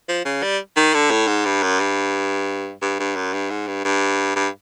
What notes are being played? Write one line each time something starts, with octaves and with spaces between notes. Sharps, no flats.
F3
C#3
G3
D#3
D3
A2
G#2
G2
F#2
G2
G2
G2
F#2
G2
G#2
G2
G2
G2